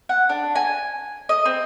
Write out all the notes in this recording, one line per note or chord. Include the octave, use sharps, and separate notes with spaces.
F#5
D4
G#5
D#5
C4